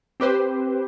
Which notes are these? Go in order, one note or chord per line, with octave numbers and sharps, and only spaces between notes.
C4 G4 B4 C5